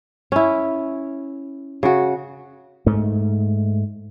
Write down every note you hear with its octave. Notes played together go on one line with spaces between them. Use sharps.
C#4 E4
C#3 F#4
G#2 A3